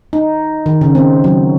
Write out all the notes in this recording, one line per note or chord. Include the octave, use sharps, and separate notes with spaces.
D#4
D#3
C#3
C4
F#3